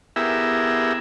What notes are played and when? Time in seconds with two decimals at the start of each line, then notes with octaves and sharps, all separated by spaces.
0.16 B3 E4 G4 G#4 A#4 E5